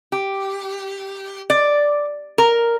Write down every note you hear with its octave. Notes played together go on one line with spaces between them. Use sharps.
G4
D5
A#4